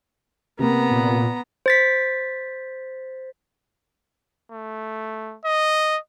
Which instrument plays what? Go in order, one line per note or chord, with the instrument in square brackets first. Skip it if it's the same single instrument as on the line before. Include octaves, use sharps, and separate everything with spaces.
[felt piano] C3 A#3 [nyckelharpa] B3 A#5
[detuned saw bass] A#2
[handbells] C5 A6 B6
[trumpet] A3
D#5